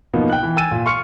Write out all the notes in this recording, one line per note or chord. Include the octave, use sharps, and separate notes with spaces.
B2 F3 A#3 B3 D#4
G5 F#6
E3
G5 G#5 E6 A6 D#7
A#2
C6 C#6 F6 C#7